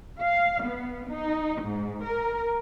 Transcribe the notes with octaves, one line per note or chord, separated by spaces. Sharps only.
F5
B3
D#4
G#2
A#4